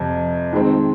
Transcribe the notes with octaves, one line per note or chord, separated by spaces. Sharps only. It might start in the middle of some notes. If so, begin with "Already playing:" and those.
Already playing: F2 C3
D#3 G#3 C4